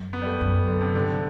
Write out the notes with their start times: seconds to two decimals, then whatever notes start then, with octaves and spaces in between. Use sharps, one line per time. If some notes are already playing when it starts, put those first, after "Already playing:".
Already playing: F#2
0.13 B3
0.22 G3
0.27 A3
0.41 F#2
0.68 D3
0.81 C3
0.95 G2 D3